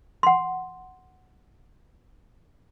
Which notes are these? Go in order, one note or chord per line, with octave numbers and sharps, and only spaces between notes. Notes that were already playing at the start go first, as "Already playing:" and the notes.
F#5 C6